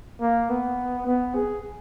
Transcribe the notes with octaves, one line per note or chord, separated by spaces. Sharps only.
A#3
B3
B3
G#4